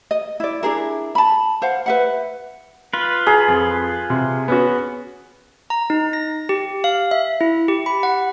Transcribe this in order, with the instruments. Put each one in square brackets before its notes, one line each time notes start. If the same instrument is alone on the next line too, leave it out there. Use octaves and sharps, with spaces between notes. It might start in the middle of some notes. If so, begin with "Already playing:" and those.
[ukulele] D#5
E4 D5
D4 E4 G#4 A#4
A5 B5
C5 F5 F#5
B4 E5 F#5
[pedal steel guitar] F4 B4
[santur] G#4 [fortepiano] A#5
[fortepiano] F2
C3
B3 C#4 F#4
[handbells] A#5
D#4
A#6
G4
F5
E5
E4
G4
B5
F#5